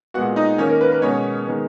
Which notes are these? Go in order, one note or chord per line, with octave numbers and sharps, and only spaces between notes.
A#2 G#3 B3 F#4 F#5
D#4 D#5
D#3 A#3 C#4 C#5
A#4
B4
B4
B2 G#3 B3 C#4 C#5
D#3 G#3 B3